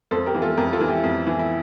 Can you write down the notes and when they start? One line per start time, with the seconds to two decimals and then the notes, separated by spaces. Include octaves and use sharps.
0.11 F2 A4 C5
0.26 G4 A#4
0.35 E3
0.42 F4 A4
0.57 F2 G4 A#4
0.73 F4 A4
0.80 E3
0.88 E4 G4
1.04 F2
1.27 E3
1.39 E4